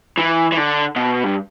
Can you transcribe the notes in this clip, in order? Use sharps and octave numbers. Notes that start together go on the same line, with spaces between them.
E3
E3
D3
B2
G2